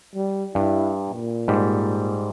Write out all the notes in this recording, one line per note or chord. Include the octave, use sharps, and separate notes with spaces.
G3
G2 E4
A#2
G#2 G3